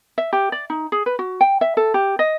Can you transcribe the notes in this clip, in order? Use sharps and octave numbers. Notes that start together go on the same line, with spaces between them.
E5
G4
D5
D#4
G#4
B4
F#4
G5
E5
A4
G4
D#5